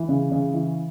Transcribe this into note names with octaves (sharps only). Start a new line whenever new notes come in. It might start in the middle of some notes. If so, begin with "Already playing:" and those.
Already playing: E3
C#3
C#3
E3